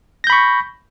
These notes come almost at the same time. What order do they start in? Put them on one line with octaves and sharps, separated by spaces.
A#6 G6 B5 C#6